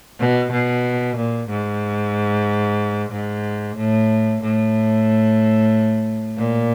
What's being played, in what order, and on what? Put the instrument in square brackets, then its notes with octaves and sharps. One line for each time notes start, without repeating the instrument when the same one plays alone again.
[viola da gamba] B2
B2
A#2
G#2
G#2
A2
A2
A#2